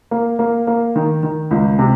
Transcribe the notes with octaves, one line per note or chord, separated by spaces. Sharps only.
A#3
A#3
A#3
D#3
D#3
C#2
C3